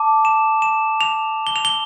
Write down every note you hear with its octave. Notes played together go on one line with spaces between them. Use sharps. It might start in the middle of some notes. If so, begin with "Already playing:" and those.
Already playing: A5 D6
E7
E7
F7
G7
F7
G7